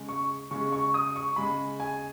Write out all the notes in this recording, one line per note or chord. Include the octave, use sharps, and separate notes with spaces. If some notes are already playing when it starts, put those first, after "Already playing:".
Already playing: C#3 G#3
C#6
C#3 G#3 C#6
C#6
D#6
C#6
C#3 G#3 B5
G#5